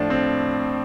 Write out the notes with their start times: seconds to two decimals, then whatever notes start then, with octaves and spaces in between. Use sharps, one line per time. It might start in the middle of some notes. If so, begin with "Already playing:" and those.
Already playing: A2 F3 D4
0.10 C4